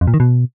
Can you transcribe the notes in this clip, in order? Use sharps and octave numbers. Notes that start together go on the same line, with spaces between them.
F2
A#2
D#3
B2